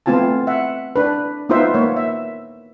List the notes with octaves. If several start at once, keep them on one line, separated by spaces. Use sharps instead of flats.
A3 B3 C4 F4 G#5 A5
E5 F#5
D4 B4
B3 D#4 F4 B4 C5 E5
A#3 C#5
E5